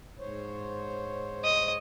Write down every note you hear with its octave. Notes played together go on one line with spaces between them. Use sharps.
G#2 C5 C#5
D#5